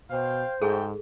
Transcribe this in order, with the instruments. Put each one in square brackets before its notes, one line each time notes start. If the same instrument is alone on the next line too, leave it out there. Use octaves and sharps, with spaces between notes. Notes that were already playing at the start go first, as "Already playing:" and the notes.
[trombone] B2 [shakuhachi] C5 [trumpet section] F5 G5
[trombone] G#2 [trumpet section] A3 F#4 G5 [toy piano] G#4 A4